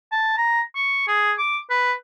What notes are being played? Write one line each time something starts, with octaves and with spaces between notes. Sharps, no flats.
A5
A#5
C#6
G#4
D6
B4